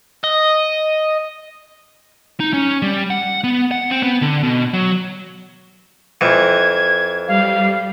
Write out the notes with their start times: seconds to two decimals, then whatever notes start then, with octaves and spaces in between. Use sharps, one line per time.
0.24 D#5
2.40 D#4
2.53 C#4
2.82 G3
3.10 F#5
3.44 B3
3.71 F#5
3.91 C4
4.03 B3
4.22 D3
4.43 B2
4.74 F#3
6.21 F2 E3 G#6
7.28 G3 F5